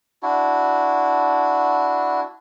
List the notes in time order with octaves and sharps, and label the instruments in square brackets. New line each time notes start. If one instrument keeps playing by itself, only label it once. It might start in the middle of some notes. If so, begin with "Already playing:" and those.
[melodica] D4 E4 F#4